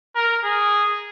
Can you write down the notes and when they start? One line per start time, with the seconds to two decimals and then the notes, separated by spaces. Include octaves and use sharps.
0.16 A#4
0.44 G#4